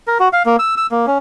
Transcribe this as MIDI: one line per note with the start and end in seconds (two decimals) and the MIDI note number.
0.07 0.18 70
0.20 0.29 66
0.33 0.43 77
0.46 0.56 58
0.59 0.75 88
0.77 0.87 88
0.91 1.06 58
1.07 1.18 61